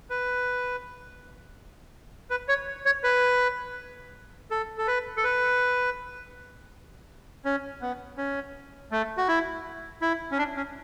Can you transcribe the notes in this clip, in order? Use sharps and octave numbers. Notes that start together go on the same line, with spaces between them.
B4
B4
C#5
C#5
B4
A4
A4
B4
A4
B4
C#4
B3
C#4
A3
F#4
E4
E4
C#4
D4
C#4